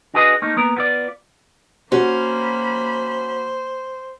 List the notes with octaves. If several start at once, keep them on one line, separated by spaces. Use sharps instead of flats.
D4 F#4 G#4 B4 C5 D#5
A3 A#3 D#4
A#3 B3 A#4
B3 F4 D5
A#3 C#4 F#4 C5 B5